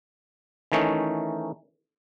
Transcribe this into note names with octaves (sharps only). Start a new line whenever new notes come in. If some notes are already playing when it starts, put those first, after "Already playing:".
D#3 E3 A3 C#4 D#4